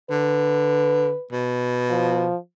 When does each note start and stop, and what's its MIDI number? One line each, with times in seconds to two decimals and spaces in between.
0.10 1.13 50
0.10 1.26 71
1.32 2.28 47
1.90 2.36 53